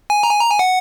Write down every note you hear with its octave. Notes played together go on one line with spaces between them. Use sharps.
G#5
A#5
G#5
A#5
G#5
F#5